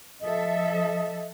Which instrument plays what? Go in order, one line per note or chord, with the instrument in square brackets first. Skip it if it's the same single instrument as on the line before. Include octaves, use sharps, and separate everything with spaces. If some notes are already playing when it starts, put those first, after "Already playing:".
[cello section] F3 A4 E5 [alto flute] D#5